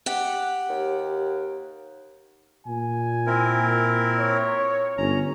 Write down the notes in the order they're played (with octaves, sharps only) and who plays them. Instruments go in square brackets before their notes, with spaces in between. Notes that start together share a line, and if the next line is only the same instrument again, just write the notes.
[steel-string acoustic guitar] G4 F#5
[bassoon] D#2
[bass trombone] A#2 [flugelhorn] G#5
[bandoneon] C4 E4 A#4
[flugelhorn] C#5
[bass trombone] G1 [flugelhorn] C#4 [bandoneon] A#5